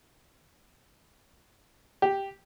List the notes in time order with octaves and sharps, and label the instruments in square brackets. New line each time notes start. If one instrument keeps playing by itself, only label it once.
[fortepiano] G4